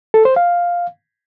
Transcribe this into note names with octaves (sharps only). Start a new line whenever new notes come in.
A4
C5
F5